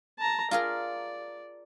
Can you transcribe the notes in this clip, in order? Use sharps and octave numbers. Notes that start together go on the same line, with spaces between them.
A5 A#5
F4 G#4 A#4 D5